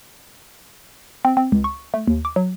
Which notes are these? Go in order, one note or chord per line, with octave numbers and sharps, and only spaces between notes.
C4
C4
C#2
C#6
A3
D#2
D6
F#3